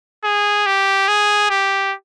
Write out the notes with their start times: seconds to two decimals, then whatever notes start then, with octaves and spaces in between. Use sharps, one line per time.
0.24 G#4
0.66 G4
1.08 G#4
1.50 G4